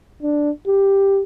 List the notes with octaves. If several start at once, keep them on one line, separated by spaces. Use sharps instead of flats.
D4
G4